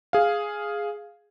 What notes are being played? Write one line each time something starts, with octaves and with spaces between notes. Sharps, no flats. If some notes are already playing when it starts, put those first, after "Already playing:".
G#4 F5